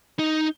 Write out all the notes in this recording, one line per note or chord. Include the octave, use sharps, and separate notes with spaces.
D#4